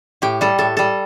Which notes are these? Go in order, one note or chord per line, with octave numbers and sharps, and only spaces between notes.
A2 G4
G3 A4
A2 A4
G3 A4